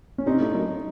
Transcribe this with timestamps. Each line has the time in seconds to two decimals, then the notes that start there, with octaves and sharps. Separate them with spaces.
0.18 C#4
0.26 C3 D#4
0.40 A2
0.54 F#2 D#4